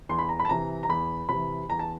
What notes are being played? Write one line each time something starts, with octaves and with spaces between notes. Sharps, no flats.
E2 C6
B5
A#5
B5
A5
C3 E3 A#5
A#5
E2 B5
C3 E3 B5
E2 A#5
A5